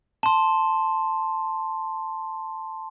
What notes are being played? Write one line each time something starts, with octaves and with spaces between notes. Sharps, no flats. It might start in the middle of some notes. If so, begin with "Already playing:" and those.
A5 C6